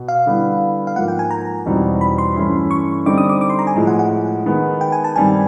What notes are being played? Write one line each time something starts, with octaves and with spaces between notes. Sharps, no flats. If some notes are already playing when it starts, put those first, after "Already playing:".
Already playing: B2
F5
D3 G3 B3 E4
F5
G#2 F3 A#3 F#5
G5
G#5
A#5
E2 B2 G3 C4 D#4
B5
C6
G2 E3 A3 C#4 E4
C#6
D3 G3 C4 D#4 D6
D#6
D6
D6
C6
A#5
G#5
A2 F3 G#3
F#5
F#5
D#3 G#3 B3
G5
G#5
A5
G2 D#3 G3 C4 G#5